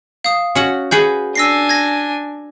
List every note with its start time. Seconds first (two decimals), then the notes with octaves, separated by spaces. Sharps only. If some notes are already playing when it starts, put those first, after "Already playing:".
0.24 F5 D#6
0.55 C#4 F#4 F#5
0.91 F#4 G#4 B4 G6
1.36 D4 G#5 E6 A#6 C7
1.69 G#6 A#6